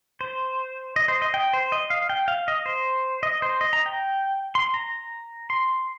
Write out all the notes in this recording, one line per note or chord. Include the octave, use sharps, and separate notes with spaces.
C5
D#5
C5
D#5
G5
C5
D#5
F5
G5
F5
D#5
C5
D#5
C5
D#5
A#5
G5
C6
A#5
C6